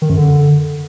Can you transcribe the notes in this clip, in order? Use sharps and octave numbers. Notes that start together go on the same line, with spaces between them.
D#3
F#2
D3